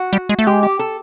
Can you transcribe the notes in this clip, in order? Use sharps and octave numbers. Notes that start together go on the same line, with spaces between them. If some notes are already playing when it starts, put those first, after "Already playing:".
Already playing: F#4
G3
G#3
A3
G#3 G4
G4
A4